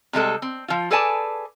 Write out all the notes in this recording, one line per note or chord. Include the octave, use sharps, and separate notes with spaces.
C3 G3 G#3 A4
C4
F3 F4
G#4 A4 B4 D5 G#5 A5